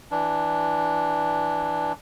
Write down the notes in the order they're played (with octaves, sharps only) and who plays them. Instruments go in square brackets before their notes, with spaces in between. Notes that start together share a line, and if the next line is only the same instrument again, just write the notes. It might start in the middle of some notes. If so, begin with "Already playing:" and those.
[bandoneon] E3 D4